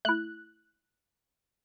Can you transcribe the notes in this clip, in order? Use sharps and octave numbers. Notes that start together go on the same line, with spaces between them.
A3 E4 F#6